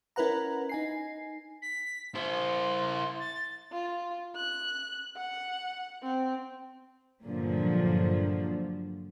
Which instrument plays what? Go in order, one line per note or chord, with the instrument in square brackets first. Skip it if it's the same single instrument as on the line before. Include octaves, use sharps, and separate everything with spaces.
[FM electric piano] C#4 E4 A#4 B4 F#5 A#5
D#4 G#5 C7
[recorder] B6
[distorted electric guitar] E4 C5 [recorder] C6
[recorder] A6
[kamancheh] F4
F#6
F#5
C4
[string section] G2 A#2 D3 F3 F#3